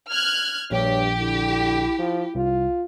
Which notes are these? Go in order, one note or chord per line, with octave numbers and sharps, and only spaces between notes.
F6 F#6 G#6
A#1 G2 G4 C#5
D3 E4
F3
C2 F4